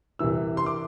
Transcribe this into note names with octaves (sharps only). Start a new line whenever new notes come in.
C2 C3 E3 E6
C6
D6